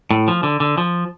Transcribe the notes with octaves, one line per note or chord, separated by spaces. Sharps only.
A2
F3
D3
D3
F3